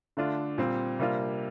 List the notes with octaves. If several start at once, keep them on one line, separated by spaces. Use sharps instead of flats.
D3 A3 D4 F4
A#2 G3 C4
C3 G3 A#3 D4 F4